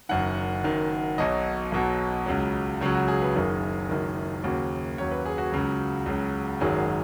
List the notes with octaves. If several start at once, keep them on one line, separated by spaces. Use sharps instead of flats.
F#1 F#2 D#3 F#5
F#1 F#2 D#3
B1 B2 F#3 D#5
B1 B2 F#3
C#2 C#3 F#3
C#2 C#3 F#3 C#5
F#4
G#4
B4
F#1 F#2 D#3 G#4
F#1 F#2 D#3
D#2 C#3 F#3 F#4
D#2 C#3 F#3 C#5
B4
G#4
F#4
C#2 C#3 F#3
C#2 C#3 F#3
G#1 F#2 D#3 F#3 G#4